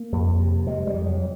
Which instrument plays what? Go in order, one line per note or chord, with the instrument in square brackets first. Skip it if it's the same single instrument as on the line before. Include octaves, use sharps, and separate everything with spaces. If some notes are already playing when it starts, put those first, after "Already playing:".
Already playing: [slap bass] A#3
F2
C3
C3 G#3
G3
F2
F#3